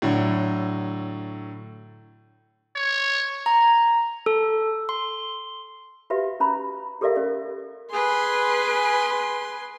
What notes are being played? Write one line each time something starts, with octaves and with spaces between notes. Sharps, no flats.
A2 D3 F#3
C#5
A#5
A4
C6
F#4 G4 B4 E5 F5
C#4 A#5 B5
G4 A4 A#4 D5 E5 F5
C#4 A#4 D5
G#4 B4 G#5 C6